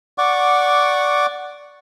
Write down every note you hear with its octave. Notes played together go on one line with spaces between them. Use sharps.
D5 F#5 C#6 D6